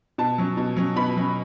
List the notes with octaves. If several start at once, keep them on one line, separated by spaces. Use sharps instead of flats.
B2 A5
F#3 C#4
B2
F#3 C#4
B2 B5
F#3 C#4